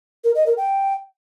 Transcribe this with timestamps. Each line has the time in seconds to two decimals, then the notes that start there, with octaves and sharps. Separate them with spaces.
0.24 A#4
0.35 D#5
0.46 A#4
0.57 G5